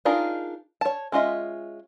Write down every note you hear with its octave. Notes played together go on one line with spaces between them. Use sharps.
D4 D#4 F4 G#4 A#4
C#5 A5
G#3 C#4 F4 D#5 E5